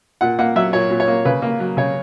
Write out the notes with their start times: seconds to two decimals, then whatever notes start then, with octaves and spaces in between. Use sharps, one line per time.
0.21 A#2 F#5
0.39 A#3 F#5
0.56 F#3 E5
0.73 A#2 C#5
0.90 A#2
1.00 C#5
1.07 A#3
1.25 C#3 B4
1.42 A#3
1.60 F#3
1.77 C#3 C#5